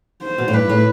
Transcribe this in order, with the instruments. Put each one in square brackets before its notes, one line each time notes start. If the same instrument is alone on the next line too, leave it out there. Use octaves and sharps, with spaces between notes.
[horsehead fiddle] C5
[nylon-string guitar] B2
A2
[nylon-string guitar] G2 [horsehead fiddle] B4
[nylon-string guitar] A2